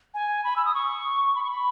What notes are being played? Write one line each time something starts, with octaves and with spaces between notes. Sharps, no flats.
G#5
B5
E6
D#6
C#6
B5
C#6
B5